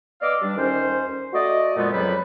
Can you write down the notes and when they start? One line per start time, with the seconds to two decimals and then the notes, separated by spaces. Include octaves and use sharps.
0.22 B3 D5 D#5 F5 D6 E6
0.42 G3 D4
0.57 D2 D#3 C#4 C5
1.34 A3 F#4 D5 D#5
1.77 F2 A#2 G#3 A3 B3 D5
1.92 F2 C#3 F#3 G3 B4 B5